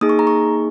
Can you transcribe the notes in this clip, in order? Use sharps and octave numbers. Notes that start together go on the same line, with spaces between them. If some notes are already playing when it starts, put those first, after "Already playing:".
A#3 D#4 G#4 D#6
C#6
A#5
C#6